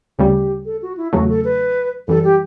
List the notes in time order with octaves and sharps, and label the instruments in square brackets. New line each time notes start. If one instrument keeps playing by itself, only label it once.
[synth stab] D2 C#3 G3 [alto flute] G4
[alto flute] A4
F#4
E4
[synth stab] E2 C#3 F#3 A3 [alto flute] F#4
[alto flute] A4
B4
[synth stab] F#2 E3 G3 [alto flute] A4
[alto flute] G4